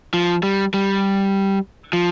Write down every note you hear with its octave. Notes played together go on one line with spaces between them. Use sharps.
F3
G3
G3
F3